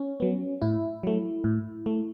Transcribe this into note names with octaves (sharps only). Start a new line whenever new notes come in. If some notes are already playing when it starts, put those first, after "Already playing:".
Already playing: C#4
F#3 B3
A2 E4
F#3 A3
A2
A3